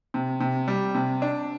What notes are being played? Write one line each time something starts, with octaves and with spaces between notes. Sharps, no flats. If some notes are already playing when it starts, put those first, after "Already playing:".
C3
C3
G3
C3
D4